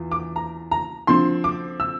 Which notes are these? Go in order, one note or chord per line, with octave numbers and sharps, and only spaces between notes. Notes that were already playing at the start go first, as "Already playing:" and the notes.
Already playing: E2 E3 F4
D6
A#5
A#5
D3 F3 C4 C6
D6
E6